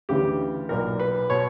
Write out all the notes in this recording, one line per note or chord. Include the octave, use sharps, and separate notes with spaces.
D2 C#3 E3 G4
B1 A#2 A#4
B4
B2 C#5